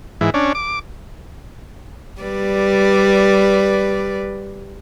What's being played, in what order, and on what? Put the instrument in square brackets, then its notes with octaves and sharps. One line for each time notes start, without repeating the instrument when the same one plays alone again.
[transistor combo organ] G#2 E3
C#4 D4
D6
[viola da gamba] G3 B4 D5